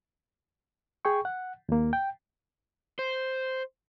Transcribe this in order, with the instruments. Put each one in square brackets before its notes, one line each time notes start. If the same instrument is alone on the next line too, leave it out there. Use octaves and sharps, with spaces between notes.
[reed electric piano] G#4 G5 C#6
F#5
D#2 A#3
G5
[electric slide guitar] C5